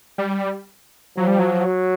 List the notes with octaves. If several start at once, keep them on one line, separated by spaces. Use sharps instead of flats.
G3
F3 F#3
G3
F#3
F#3